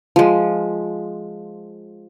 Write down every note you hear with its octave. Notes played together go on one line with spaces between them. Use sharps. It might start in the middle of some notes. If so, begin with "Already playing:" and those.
F3 G#3